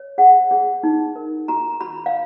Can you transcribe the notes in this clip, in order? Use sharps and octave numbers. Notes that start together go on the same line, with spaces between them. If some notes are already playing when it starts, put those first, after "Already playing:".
Already playing: C#5
G#4 F#5
G#4
D#4
A#4
F#4 A#5
F#4 B5
F5